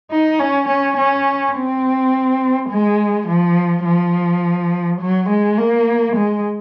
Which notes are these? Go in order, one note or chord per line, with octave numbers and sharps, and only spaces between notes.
D#4
C#4
C#4
C#4
C4
G#3
F3
F3
F#3
G#3
A#3
G#3